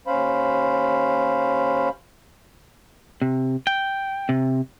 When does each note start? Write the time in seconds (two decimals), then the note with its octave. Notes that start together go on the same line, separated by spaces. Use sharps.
0.07 D#2 C#4 C5 F5 B5
3.22 C3
3.67 G5
4.29 C3